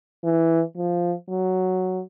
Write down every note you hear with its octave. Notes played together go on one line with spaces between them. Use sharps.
E3
F3
F#3